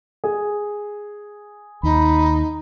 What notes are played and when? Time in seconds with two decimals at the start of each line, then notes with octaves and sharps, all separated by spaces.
0.24 G#4
1.83 D#2 D#4 B5